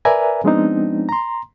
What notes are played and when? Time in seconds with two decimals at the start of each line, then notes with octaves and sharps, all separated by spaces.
0.05 A#4 B4 D5 E5 G#5 A#5
0.44 F3 G#3 B3 C4 D4 D#4
1.09 A#5 C6